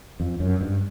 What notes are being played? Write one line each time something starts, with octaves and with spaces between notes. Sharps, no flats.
F2
F#2
G2